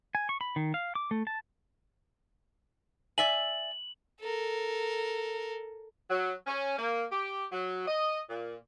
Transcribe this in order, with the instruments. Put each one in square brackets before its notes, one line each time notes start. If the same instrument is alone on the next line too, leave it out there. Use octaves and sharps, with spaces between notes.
[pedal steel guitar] G#5
C#6
B5
D#3
F5
D6
A3
A5
[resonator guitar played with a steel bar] D5 E5 G#5 [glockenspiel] F#7
[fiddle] A4 A#4
[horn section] F#3
C#4
A#3
G4
F#3
D#5
A#2